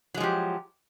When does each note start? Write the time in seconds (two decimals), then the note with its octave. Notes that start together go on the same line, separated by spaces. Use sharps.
0.14 F#3
0.17 G#3
0.20 F3
0.23 G4